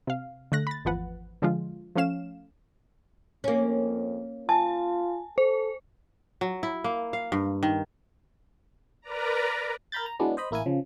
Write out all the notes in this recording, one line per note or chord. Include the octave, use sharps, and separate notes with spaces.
C3 F5
D3 A3 F#6 A#6
B5 A6
G#1 E2 F3 B4 F#5
D3 F3 G#3 F4
F3 A3 C#4 F5 E7
F2 A#3 C#4
F4 G#5 A5
A4 C5
F#3
E4
A#3
F5
G2
D#3
A#4 B4 D5 A#5
A#4 A#5 B5 G6 A6
A#5
E3 F#3 G#3 B3 D4
C5 D#5 B5
A1 A#3 E4 A#4 G#5
C#3 F3